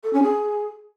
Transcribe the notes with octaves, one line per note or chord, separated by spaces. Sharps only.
A4
C#4
G#4